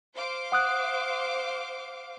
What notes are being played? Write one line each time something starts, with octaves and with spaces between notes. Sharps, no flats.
C5 F5 D6
F#5 D#6 F#6